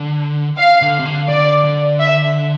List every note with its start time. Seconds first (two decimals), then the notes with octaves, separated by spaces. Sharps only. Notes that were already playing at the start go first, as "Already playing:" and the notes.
Already playing: D3
0.57 F5
0.82 D3
0.99 C3
1.06 D3
1.28 D3 D5
1.64 D3
1.99 E5